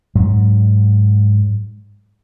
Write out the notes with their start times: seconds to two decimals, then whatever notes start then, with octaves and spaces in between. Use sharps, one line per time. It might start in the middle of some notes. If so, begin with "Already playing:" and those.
0.15 G#2 F#3